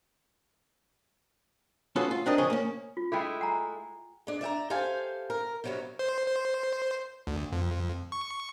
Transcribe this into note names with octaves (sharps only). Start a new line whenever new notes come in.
C#4 F4 F#4 G#4 A4 B4
F4
C4 D4 A#4 D#5
C#3 F3 G#4 C#5 D#5
A#3 C#4
F4
G#3 A3 E4 G#4 G5 B5
F#5 G#5 A#5
G#3 D4
D5 E5 G5 A#5
G4 A4 C5 F5 G#5
A#4
G2 C3 F#3 B3 C#4 F#4
C5
C5
D2
F2
C#6